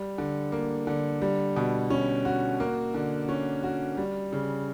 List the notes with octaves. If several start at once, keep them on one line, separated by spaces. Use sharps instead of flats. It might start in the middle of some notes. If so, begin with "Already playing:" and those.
Already playing: G3
D3
A#3
D3
G3
B2
C#4
F#4
A#3
D3
C#4
F#4
G3
C#3